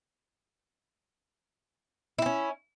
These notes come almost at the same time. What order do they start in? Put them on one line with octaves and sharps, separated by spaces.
E4 C4 C#4